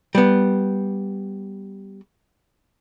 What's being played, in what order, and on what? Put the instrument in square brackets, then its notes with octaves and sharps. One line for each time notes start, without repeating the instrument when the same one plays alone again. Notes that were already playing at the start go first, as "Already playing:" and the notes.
[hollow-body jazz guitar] G3 B3